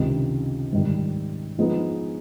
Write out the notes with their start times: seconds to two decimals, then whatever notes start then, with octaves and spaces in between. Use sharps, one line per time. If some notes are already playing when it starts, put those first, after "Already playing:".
Already playing: C#2 C3 D#3
0.73 G#2 D#3 G3
1.58 F3 G#3 B3 D#4